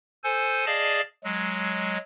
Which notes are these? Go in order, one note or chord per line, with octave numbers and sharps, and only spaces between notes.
A4 C5 G#5
G#4 D5 D#5 F5 A5
F#3 G#3